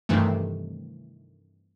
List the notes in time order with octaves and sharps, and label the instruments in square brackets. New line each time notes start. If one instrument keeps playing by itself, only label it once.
[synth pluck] G2 C3 D#3 E3 A3